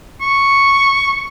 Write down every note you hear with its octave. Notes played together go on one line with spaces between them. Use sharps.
C#6